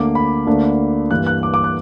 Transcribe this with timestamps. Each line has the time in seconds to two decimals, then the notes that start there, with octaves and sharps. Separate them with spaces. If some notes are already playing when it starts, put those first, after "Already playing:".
Already playing: D2 D3 A#3 D6
0.15 B5
0.47 D2 D3 A#3 D4
1.11 G2 E3 A#3 F#6
1.27 F#6
1.43 D6
1.54 D6
1.64 F#6